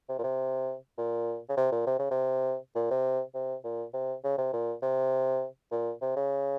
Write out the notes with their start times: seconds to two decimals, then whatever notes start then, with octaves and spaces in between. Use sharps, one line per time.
0.09 C3
0.19 A#2
0.23 C3
0.98 A#2
1.49 C#3
1.57 C3
1.72 A#2
1.87 C3
1.99 C#3
2.11 C3
2.75 A#2
2.90 C3
3.34 C3
3.64 A#2
3.93 C3
4.24 C#3
4.38 C3
4.53 A#2
4.82 C3
5.71 A#2
6.01 C3
6.16 C#3